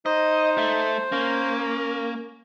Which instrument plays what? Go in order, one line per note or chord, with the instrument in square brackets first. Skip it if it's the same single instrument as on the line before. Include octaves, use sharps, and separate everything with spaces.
[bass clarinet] D#4 [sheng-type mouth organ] C5 [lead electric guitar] D#5
[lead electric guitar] A3
[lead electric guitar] A#3 [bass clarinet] C#4